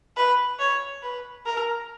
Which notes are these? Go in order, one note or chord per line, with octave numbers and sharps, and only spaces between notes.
B4
C#5
B4
A#4